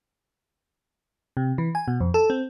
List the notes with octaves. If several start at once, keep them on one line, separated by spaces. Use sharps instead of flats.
C3
E3
G#5
B2
F2
A4
C4